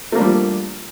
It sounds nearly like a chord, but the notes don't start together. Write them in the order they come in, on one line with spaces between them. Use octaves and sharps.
A3 A#3 D4 G3 F3